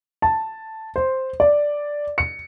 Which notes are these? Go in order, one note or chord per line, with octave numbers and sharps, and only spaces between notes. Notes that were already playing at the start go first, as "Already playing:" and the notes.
A5
C5
D5
C#7